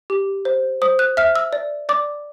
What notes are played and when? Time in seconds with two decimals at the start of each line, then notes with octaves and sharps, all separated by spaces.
0.10 G4
0.45 C5
0.82 C5 D#6
0.99 F#6
1.17 E5 F6
1.36 E6
1.53 D5
1.89 D5 D6